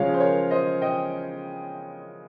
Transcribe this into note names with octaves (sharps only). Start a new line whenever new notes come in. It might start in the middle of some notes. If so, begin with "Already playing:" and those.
Already playing: C#3 F3 G#3 C#5 F5
C5
A#4 C#5
C5 D#5
D#5 G5